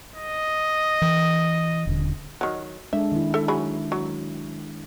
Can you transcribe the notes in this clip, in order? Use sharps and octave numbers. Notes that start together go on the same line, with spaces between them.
D#5
E3
D#1 D3
D#3 F#3
G#3 D4 A4 E5
D#3 E4
A4 E5
F#3 G#4 B5
F#3